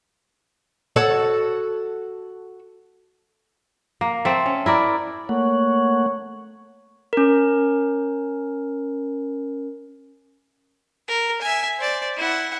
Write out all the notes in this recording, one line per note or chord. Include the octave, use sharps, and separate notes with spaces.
F#4 A4 C#5
A#3
A3 C4
C#4
E4 A#4 D5
A3 A#3 C#5 F#5
C#4 A#4
A#4
E5 G#5
C5 D5
E4 F#5